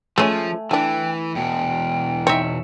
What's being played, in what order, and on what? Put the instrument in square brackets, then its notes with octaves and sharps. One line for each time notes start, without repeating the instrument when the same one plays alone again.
[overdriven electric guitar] F3 [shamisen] G#3 C#4 C#5 [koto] A3 G#5
[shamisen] D3 D4 [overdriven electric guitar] E3 [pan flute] G5
[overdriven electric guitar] E2 B2 [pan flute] G5
[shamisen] C4 D#4 [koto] C#5 E5